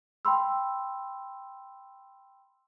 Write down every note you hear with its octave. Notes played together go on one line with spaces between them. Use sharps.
G5 B5 C6 E6